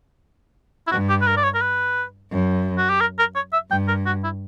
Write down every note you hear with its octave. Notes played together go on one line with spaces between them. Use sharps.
E4
G2 F#4
G4
B4
A#4
D5
C#5
A#4
B4
F#2
F#4
G4
A#4
A#4
C#5
E5
G2 G5
A#4
F#4
E4